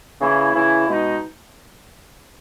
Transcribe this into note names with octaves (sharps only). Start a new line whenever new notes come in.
C#3 E3 A#3 E4
C#3 E3 A#3 E4
B2 G#3 D#4